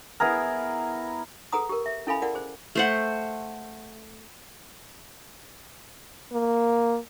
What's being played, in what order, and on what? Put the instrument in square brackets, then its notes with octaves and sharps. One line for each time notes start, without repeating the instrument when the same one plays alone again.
[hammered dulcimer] B3 E4 G#4 A#4
[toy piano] G#4 A4 B4 F#5 A#5 D#6
G4 A#4
E5
C#4 E4 A4 F5 G#5 B5
E4 G#4 A#4 D5 F#5
G#4 C5
[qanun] A3 C5 F#5
[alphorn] A#3